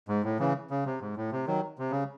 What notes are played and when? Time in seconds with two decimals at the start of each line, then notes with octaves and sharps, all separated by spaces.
0.08 G#2
0.24 A2
0.39 C#3 E3
0.70 C#3
0.86 C3
1.01 G#2
1.17 A2
1.32 C3
1.47 D#3 F#3
1.78 C3
1.91 C#3